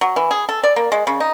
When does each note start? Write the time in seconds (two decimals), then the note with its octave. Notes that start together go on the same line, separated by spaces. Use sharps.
0.01 F#3
0.16 E3
0.31 G#4
0.49 A4
0.63 D5
0.76 A#3
0.92 G#3
1.07 C#3
1.20 D#4